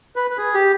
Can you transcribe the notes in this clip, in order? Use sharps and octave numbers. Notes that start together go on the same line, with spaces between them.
B4
B4
G#4
G4